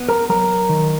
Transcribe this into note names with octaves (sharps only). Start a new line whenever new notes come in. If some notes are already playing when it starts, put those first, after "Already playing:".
Already playing: B3
A#4 A#5
F#3 A#4 A#5
D#3